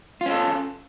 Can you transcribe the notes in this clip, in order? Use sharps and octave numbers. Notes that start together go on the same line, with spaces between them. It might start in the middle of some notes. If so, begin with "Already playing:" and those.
C#4 F4 A4